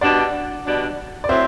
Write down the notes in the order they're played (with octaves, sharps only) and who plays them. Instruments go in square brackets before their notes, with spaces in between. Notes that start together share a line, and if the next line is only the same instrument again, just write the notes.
[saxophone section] B2 G3 D4 [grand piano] D5 F#5
[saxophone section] B2 G3 D4
[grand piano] D5
[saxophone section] A2 F#3 C4 [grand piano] C5 E5